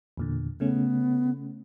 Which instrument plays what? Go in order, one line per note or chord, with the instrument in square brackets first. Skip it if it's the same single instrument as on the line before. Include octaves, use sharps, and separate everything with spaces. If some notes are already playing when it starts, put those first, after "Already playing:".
[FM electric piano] E2 A#2 D3
[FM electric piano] C#3 A3 C#4 [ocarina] B3